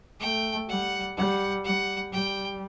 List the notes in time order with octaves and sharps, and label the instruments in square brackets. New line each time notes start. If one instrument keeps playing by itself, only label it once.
[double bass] A3 [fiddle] G5
[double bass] G3 [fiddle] F#5
[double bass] G3 [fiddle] F#5
[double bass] G3 [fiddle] F#5
[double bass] G3 [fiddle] G5